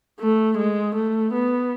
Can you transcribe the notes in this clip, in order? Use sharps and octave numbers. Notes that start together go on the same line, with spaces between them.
A3
G#3
A3
B3